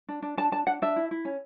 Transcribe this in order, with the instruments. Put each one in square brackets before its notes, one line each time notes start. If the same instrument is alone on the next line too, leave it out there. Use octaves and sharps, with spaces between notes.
[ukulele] D4
D4
D4 A5
D4 A5
D4 F#5
D4 E5
E4
E4
C#4